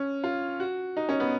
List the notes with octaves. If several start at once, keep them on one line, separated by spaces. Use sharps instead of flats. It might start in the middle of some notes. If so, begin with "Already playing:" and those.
Already playing: C#4
F4
F#4
D#4
C#4
B3